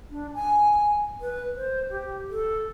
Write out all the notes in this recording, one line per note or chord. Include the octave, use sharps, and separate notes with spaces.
D4
G#5
B4
C5
G4
A4